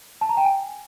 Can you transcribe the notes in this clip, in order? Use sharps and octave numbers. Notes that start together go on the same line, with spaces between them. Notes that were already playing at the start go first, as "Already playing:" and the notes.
A5
A#5
G5
G#5